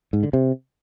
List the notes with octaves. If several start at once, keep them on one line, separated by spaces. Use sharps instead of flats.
G#2
D3
C3